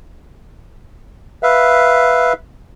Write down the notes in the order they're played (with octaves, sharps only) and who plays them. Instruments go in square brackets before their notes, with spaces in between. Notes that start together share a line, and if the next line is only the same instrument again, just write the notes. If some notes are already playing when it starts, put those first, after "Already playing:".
[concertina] B4 E5 F5